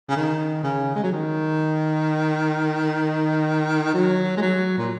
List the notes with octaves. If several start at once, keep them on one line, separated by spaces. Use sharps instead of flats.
C#3
D#3
C#3
G#3
F#3
D#3
F#3
G#3
F#3
A#2